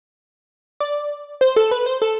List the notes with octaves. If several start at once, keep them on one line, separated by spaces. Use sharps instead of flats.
D5
C5
A4
B4
C5
A4